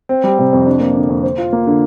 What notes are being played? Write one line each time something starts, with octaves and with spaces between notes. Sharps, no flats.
C4
G3
C3
F2
D4
A#3
D3
F2
C5
F4
A#3
D3